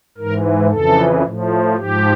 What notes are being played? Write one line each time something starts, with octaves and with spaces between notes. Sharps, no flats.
G#2 E3 A#4
F2 C#3 E3 A4
A2 F3
G#2 F3 G4